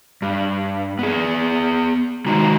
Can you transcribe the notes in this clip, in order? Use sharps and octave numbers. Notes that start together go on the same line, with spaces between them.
G2
B3 G#4
C3 D#3 G#3 D#4 F#4 A#5